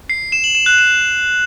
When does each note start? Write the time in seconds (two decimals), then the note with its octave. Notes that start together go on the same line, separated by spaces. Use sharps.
0.10 C7
0.32 E7
0.44 F#7
0.55 E7
0.66 F#6
0.79 E7